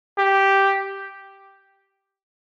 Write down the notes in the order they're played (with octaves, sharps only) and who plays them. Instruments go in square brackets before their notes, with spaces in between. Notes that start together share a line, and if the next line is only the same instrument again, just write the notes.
[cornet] G4